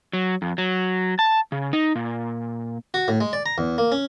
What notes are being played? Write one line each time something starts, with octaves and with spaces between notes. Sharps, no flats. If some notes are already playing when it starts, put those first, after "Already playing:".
F#3
F2
F#3
A5
C#3
D#4
A#2
F#4
A2
G#3
D5
A#5
E2
A#3
C#4